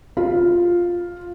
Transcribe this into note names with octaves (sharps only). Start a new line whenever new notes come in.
F4